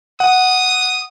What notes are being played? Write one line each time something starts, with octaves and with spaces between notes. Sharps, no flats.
F#5 D#6